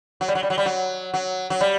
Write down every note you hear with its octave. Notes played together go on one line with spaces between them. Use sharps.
F#3
G3
F#3
G3
F#3
G3
F#3
F#3
F#3
G3